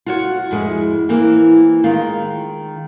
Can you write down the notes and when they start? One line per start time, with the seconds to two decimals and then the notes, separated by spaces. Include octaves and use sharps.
0.06 F4 F#4 C#5
0.51 F2 G#3 E4
1.09 E3 A#3 C4
1.84 D#3 G#3 F4